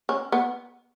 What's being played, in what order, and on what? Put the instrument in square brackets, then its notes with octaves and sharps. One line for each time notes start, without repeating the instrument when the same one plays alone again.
[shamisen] C#4
B3